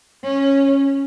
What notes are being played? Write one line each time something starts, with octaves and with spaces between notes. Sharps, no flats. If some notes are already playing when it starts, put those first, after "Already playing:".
C#4